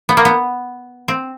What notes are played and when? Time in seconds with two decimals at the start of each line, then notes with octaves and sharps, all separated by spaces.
0.09 B3
0.17 A#3
0.25 B3
1.08 C4